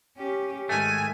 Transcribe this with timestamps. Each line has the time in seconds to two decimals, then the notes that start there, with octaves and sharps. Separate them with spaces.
0.17 C#4 G4
0.69 G#2 D#3 A3 G#5